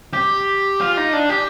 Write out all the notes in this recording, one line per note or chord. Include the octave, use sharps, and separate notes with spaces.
G4
F4
D#4
D4
G4